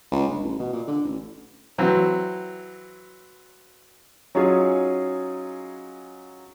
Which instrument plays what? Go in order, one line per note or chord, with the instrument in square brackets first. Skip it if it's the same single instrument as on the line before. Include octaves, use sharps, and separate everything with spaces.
[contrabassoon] C#2
G1
A1
B2
A#2
D3
A1
[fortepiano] E3 F#3 C4
[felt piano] F#3 C#4 D#4 F4 G#4